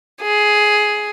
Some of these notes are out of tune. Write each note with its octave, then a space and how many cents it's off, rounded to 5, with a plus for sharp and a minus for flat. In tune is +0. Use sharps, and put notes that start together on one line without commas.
G#4 +10